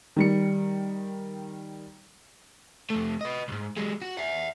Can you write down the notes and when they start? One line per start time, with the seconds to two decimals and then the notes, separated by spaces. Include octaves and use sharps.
0.17 D#3 G3 C#7
2.90 F2 A3
3.21 B4 D#5
3.48 C2 G#2
3.77 F#3 G#3
4.02 F#4
4.17 E5 F#5